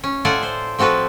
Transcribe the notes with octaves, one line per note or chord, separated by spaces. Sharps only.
C#4
A2 F4 A4 D5 F#5 G#5
C5
F3 C4 F#4 A4 B4